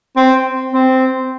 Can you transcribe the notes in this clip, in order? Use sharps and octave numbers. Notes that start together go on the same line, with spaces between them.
C4
C4